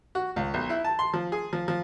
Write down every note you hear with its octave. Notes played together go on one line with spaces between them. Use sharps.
F#4
C#2
B1
E4
A5
C6
F3
G#4
F3
F3